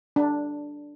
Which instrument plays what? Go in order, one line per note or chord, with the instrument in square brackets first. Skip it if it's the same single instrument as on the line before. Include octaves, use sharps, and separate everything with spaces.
[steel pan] D4